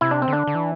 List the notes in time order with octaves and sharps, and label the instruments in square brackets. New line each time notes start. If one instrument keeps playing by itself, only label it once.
[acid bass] C3 [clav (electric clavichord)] E4
[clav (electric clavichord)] D4
C4
[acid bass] D3 [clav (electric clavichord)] D4
[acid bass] D3
E3